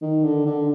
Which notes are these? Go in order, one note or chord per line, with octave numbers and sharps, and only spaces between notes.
D#3
D3
D3